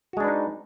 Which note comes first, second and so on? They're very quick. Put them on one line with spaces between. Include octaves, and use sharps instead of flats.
F#4 G#3 D4 B4 D#4